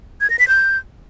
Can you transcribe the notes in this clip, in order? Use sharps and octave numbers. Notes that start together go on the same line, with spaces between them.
G#6
A#6
B6
G6